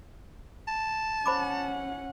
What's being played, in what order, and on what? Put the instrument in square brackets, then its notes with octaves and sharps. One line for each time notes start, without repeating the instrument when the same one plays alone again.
[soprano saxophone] A5
[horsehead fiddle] C#4 F#5 [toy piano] C5 B5 D6